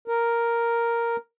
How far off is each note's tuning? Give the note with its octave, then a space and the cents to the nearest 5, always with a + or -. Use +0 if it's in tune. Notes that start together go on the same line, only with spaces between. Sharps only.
A#4 +0